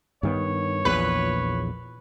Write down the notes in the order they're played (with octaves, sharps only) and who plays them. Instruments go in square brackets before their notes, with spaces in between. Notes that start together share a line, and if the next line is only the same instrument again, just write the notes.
[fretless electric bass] G2 D#3 B3 [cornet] C#5
[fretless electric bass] A#1 E2 A#2 [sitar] B4